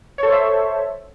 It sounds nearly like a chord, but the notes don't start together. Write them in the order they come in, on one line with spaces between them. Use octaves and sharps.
C#5 A4 C5 E5